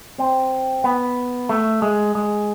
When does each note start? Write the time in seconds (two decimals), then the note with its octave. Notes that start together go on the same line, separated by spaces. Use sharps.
0.18 C4
0.84 B3
1.49 A3
1.82 G#3
2.15 G#3